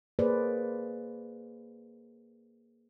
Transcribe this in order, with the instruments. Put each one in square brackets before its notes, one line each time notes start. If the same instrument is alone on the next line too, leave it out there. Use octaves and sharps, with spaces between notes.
[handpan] A#3 G#4 B4 C5 D5